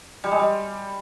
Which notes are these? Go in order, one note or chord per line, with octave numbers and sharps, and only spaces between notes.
G3
G#3
G3